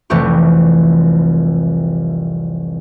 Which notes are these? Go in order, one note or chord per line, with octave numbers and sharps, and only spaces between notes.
F1 C2 E3 A3 G4 C#6